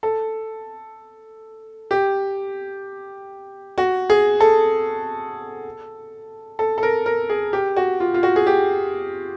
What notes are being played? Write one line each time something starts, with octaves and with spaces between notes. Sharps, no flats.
A4
G4
F#4
G#4
A4
A4
A4
A#4
A#4
G#4
G4
F#4
F4
F4
F#4
G#4
G4